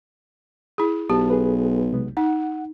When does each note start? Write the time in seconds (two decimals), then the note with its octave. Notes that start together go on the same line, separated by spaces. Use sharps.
0.78 E4 G#4
1.10 B1 G4 A5
1.30 G#4 A4 B4
1.92 C3 G#3 B3
2.17 D#4 F#5